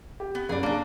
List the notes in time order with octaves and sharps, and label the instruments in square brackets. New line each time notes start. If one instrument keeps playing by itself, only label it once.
[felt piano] G4
[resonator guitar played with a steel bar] B3
[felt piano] F#1 [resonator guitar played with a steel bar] G#4 D5
[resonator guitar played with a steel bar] A#3 G#4 [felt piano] D4